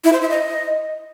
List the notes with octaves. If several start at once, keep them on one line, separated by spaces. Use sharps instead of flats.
E4
C5
E5
D#5